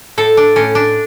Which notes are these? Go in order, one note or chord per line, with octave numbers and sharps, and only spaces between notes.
A2 A4
D4
A2 C#4
D4